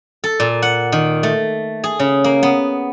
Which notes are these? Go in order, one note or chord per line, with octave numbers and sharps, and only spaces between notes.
A4
A#2
F#5
D#3
A3
G#4
C#3
A#3
B3